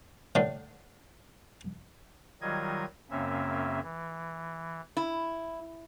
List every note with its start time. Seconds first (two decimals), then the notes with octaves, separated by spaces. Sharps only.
0.35 A2 D3
2.41 D#3 F#3 G3 F4 D#5 G#6
3.10 F#2 C#3 A#3 C4 C#4 E5
3.83 E3
4.97 E4